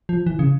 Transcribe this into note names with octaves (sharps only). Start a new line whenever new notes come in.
F3
E3
C#3